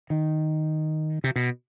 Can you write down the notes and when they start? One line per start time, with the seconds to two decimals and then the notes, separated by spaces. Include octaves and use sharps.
0.10 D#3
1.24 C3
1.36 B2